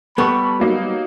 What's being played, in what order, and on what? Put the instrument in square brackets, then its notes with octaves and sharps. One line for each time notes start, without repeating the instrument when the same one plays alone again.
[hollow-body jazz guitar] G3 B3 [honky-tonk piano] A4 C#6 [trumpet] B5
[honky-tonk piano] F#3 A#3 D#4